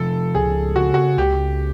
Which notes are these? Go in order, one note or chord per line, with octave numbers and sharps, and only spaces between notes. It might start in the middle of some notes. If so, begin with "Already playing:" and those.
Already playing: C3 F3 A4
C#2 G#4
C#3 F#4
F#4
C#2 G4